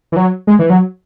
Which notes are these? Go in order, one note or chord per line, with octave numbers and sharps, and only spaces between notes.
E3
F#3
G#3
E3
F#3